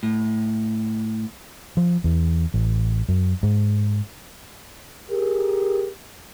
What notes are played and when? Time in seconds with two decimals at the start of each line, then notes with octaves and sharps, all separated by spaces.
0.03 A2
1.77 F3
2.04 E2
2.54 A1
3.09 F#2
3.43 G#2
5.10 G4 G#4 A#4